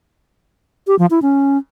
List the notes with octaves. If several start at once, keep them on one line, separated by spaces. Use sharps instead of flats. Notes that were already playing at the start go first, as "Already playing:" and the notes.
G4
F3
E4
C#4